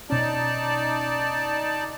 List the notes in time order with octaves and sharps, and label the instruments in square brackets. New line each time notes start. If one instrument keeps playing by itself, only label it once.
[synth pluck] B2 C#4 [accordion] D#4 D5 A5